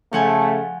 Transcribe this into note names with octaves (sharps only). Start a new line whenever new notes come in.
C#3 F3 A3 F#5 G#5